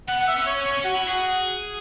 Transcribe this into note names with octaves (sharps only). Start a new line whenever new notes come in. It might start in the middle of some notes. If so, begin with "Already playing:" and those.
B3 F#5
F#5
E5
C#4
C#5
C#4 C#5
C#4 F#4
E4
F#4 G#4